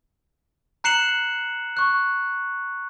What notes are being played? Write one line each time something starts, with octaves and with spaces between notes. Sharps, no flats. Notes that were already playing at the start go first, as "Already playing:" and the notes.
A#5 F#6 C7 C#7 E7 F#7
C#6 F#6